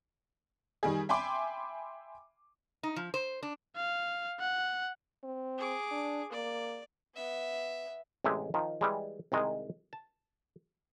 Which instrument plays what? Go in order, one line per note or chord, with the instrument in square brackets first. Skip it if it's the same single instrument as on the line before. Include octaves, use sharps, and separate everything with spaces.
[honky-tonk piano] D#3 G3 G#4
E5 G5 G#5 B5 C6 D6
[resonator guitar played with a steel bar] D#4
F3
C5
D4
[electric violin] F5
F#5
[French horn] C4
[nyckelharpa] G#4 D6
[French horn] D4
[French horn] A#3 [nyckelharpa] D5
[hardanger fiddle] B3 E5
[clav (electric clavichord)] A1 C3 G#3 G4 E5
D#3 F3
E3 G3 G#3
C2 D#3 G#3 D#5
A5